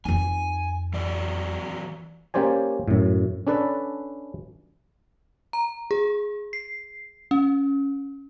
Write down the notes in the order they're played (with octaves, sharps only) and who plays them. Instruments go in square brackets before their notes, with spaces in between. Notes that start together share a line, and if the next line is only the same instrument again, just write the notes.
[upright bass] F2 D#4 [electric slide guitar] G#5
[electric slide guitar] E3 F#3 D5
[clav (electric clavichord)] A#3 C#4 G4 C5 D5 G#5
F#2 A2
C#4 D4 A4 B4 D5
[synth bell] A#5
G#4
C7
C#4